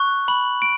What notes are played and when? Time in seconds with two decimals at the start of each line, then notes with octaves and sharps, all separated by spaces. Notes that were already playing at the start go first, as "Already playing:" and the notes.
Already playing: C#6 F#6
0.28 B5 F#7
0.62 D7